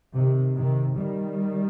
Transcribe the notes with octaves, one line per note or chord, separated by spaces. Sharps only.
C3 D#3
C3 D#3
D#3 G3